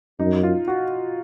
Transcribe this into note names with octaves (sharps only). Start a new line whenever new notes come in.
F#2 D#4
F4
F#4